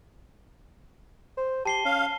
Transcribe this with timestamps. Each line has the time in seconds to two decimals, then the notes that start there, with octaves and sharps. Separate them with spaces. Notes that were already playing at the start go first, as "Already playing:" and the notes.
1.37 C5
1.66 G4 A5 C7 G7
1.85 C#4 F5